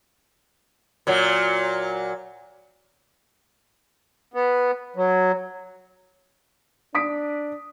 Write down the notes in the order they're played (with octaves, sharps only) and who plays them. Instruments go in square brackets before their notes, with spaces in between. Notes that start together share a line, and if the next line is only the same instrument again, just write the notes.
[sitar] A#2 F#3
[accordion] B3
F#3
[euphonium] D4 [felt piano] D#6 B6 D7